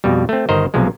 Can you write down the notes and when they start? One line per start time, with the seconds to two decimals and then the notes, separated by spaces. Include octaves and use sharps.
0.04 F2 B2 G3
0.29 A3 C4
0.49 G1 D#3 C5 D#5 A#5
0.74 B1 C3 F3 G#3